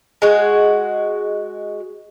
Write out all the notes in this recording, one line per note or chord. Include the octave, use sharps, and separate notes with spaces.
G#3 F#4